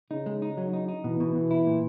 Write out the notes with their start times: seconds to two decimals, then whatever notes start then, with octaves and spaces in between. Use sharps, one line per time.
0.11 C#3 D#4
0.26 G#3
0.42 D#4
0.57 F#3
0.73 D#4
0.88 D#4
1.04 B2 E3
1.20 B2
1.35 B2
1.51 E4
1.66 A#2